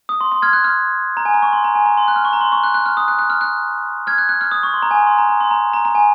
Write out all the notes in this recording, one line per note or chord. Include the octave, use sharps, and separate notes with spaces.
D#6
C6
C6
F6 G#6
F#6
F6
A#5
G#5
A#5
C#6
C6
A#5
G#5
A#5
C6
F#6
F6
C#6
A#5
C6
C#6
F#6
F#6
F6
D#6
F#6
F#6
F6
F#6
F6 G#6
F#6
F#6
F6
D#6
C#6
C6
A#5
G#5
A#5
C6
A#5
A#5
C6
A#5
A#5
A#5
G#5